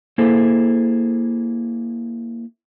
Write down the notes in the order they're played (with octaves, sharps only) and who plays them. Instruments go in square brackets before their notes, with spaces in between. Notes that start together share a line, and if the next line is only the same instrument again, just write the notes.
[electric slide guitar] A#3 E4 G#4 A4 C5